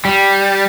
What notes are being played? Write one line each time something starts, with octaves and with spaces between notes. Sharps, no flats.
G3